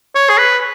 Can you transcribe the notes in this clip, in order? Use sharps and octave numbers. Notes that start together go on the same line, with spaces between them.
C#5
G#4
B4